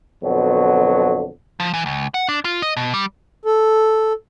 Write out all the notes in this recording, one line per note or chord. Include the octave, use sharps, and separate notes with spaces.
F2 B2 D3 F#3
F3
E3
C#2
F#5
D4
F4
D#5
B2
G3
A4